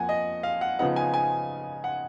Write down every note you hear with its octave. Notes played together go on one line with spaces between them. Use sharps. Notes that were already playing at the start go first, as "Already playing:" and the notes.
Already playing: F2 F3 A#3 F#5 G#5
D#5
F5
F#5
C#3 F3 B3 D#4 F#5
G#5
G#5
F#5